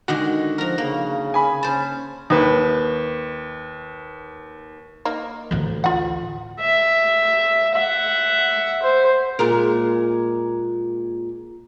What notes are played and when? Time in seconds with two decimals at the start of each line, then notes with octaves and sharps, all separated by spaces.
0.08 D3 D#3 G#3 F#4
0.58 F3 A#4 A#5
0.78 C#3 A#3
1.34 G#5 B5
1.63 C#4 C5 A5
2.30 D#2 B4
5.05 A#3 D#4
5.51 A1 D2
5.84 F4 F#5
6.60 E5
7.75 E5 F#5
8.83 C5
9.39 A#2 G#3 A#4